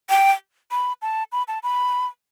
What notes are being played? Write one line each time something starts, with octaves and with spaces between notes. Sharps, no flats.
G5
B5
A5
B5
A5
B5